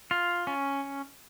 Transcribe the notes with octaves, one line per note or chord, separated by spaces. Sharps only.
F4
C#4